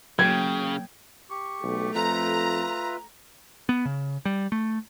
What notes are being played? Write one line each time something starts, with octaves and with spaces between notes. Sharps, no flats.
C#3 F#3 A#3 G5 G#6
G4 C#6
B1 A3
F2 F4 B4 E5 A#5
B3
C#3
G3
A3